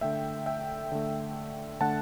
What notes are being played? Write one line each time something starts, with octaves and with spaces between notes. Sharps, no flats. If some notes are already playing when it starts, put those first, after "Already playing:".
D3 A3 E5 G5
E5 G5
D3 A3
D3 A3 F#5 A5